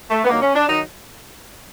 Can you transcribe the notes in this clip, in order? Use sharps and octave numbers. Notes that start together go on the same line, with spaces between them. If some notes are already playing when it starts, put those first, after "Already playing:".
A3
B3
G2 D#3 F#3 A#3
C#4
D4
D#3 F#3 D#4